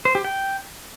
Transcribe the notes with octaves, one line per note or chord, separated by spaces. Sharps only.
C5
G4
G5